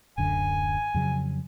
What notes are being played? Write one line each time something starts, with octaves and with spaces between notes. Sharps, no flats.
D1 F#2 D3 G#5
F2 C#3 F#3